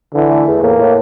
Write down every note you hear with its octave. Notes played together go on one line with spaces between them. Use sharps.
D3 E3
A3
E2
A2 A#3
A2